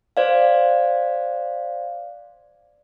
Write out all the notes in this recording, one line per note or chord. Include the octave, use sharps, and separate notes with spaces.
C5 D5 F5